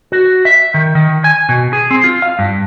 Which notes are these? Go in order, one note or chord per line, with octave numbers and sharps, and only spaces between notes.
F#4
E5
D#3
D#3
G#5
B2
G#4
C4
F4
F5
G2